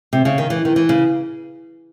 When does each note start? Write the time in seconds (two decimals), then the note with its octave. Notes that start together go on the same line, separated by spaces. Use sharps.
0.13 C3
0.25 C#3
0.38 D#3
0.50 E3
0.65 D#3
0.76 E3
0.89 C#3